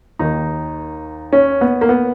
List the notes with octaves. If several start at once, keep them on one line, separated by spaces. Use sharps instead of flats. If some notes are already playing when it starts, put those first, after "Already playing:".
D#2 D#3 D#4
C#4
B3
A#3
B3